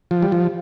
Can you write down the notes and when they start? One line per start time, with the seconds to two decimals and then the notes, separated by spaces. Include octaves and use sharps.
0.11 F3
0.23 G3
0.32 F3